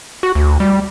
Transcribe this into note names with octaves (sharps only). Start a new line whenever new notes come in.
F#4
D2
G3